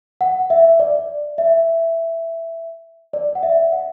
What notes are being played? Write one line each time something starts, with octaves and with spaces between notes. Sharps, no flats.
F#5
E5
D5
E5
D5
F#5
E5
F#5